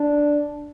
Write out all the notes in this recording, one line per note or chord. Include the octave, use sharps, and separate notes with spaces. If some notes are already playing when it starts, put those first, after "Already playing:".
Already playing: D4